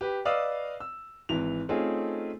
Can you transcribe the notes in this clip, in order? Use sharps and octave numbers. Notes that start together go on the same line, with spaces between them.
G4 B4
B4 D5 D#5 F5 D#6 E6
E6
G#1 E3 F7
A3 C4 C#4 D#4 F4 G#4